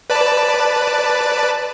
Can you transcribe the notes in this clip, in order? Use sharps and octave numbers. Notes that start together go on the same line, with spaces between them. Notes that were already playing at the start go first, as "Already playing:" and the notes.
B4 D5 A5